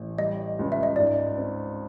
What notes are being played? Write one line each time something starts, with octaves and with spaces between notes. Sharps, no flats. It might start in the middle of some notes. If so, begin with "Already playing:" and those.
Already playing: A1
G3 D#5
C#2
E5
D#5
G#2 D5
D#5
C4